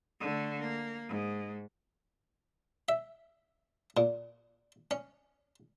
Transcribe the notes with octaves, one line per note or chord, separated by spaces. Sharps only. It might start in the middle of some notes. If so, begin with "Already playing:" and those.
D3 A3
A#3
G#2
E5
A#2
C#4